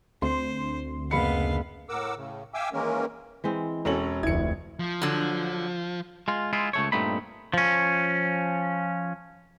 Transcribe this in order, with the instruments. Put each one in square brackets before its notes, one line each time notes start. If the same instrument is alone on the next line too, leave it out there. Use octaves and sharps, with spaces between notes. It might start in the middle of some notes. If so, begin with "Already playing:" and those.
[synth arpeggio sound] D2 [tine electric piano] C4 [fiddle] C5 [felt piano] C6
[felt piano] F#1 B5 C#7 [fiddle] B3 F5
[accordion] A2 A#4 F#5 D6 E6
A2 C#3
E5 F5 G5 G#5 D6 E6
D#3 E3 G#3 A#3 C#4 A#4
[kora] E3 G#3 C4
[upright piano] E1 C#4 F#7 [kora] C4 F#4 A4
[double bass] F1 D2 [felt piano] E4 [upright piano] G#6 C#7
[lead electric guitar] F3
[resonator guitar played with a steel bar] D3 F#3
[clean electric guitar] G#3 F4
G#3 E4 F4
C#2 A3 C#5
G2 A#2 A3 C4 D#4 B5
F3 C#4